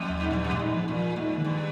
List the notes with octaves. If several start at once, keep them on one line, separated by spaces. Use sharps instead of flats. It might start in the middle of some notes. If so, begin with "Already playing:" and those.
Already playing: F2 A#3
D#2
G#2
G2 A#2
F2
G2 A#2
G#2
F3
A#2
F3
G#2 A#3
D#3
G2